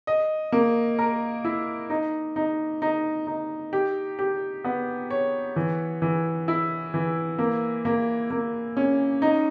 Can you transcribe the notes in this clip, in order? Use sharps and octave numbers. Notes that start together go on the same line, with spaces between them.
D#5
A#3
A#4
E4
D#4
D#4
D#4
D#4
G4
G4
B3
C#5
E3
E3
E4
E3
A#3
A#3
A#3
C#4
D#4